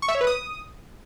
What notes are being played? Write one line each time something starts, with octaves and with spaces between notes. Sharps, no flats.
C#6
E5
C#5
B4
D#6